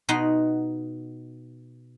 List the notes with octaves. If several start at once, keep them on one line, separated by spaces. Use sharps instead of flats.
B2 B3 D#4 F#5 C6